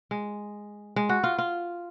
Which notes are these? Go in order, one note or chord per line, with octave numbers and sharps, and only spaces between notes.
G#3
G#3
F#4
F4
F4